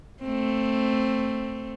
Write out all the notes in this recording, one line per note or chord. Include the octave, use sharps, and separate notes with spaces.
A3 C4